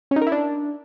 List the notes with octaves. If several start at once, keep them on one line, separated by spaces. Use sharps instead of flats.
C#4
D#4
A#4
E4
D4